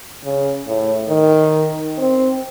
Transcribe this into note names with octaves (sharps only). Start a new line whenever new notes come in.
C#3
A2
D#3
C4